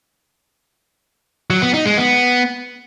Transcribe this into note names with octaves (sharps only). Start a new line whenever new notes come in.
F#3
B3
D#4
G#3
B3